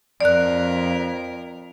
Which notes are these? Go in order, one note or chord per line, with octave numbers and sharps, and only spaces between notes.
F2 A#4 D5 F#6